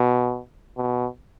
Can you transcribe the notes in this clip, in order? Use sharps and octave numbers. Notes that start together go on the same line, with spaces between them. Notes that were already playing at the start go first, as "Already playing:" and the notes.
Already playing: B2
B2